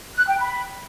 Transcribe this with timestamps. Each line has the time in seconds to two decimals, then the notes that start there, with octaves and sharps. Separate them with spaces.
0.15 F#6
0.27 G5
0.39 B5